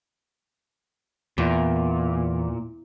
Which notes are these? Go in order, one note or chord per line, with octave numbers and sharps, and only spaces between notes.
E2 A#2